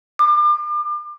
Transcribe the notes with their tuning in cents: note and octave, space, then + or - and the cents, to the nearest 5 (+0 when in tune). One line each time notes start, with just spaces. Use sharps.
D6 +35